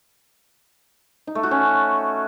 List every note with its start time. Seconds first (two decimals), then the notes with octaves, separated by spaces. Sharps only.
1.27 D#4
1.35 A3
1.43 F#4
1.51 C#4